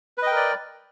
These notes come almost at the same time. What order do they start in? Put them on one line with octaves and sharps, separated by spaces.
B4 D#5 G5 A#4 D5